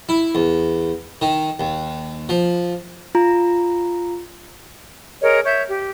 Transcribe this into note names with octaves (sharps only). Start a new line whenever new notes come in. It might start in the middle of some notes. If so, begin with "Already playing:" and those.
E4
E2
D#3
D#2
F3
F4 A#5
G#4 A#4 C#5 D#5
C#5 E5 G6
G4